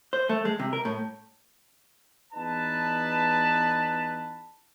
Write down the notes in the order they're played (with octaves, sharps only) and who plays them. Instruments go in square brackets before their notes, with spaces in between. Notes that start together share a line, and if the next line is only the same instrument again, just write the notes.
[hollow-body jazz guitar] C5
A3
G#3
C3
A#4
A2
[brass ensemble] E2 D#4 B4 A5